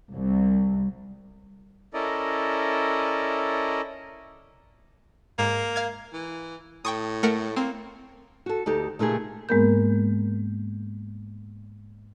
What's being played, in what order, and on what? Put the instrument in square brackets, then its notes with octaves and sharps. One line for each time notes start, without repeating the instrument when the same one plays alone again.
[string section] C2
[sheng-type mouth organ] C#4 E4 A4 A#4 D5 D#5
[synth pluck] G#2 [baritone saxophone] A#3
[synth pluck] F5 G#6
[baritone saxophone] E3
[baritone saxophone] A2 [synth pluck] G5 C#6 D#6
[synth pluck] A3 A#4 F#5
[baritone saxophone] A#3 [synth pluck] C4
[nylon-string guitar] F#4 A4
D2 D#4 G4 A4
A#2 C#3 A3 D#4 G4 G#4
[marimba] G#2 G#3 A#3 B3 A#4 G6